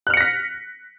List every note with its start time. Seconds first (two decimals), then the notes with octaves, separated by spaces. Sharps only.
0.07 F#6
0.10 F6
0.14 C#7
0.17 A#6
0.21 B6